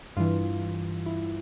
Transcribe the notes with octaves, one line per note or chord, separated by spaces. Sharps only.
G2 E3 F4
E4